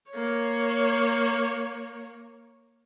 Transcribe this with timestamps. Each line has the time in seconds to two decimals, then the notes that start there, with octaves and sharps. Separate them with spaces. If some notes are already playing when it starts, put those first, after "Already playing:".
0.11 A#3 C#5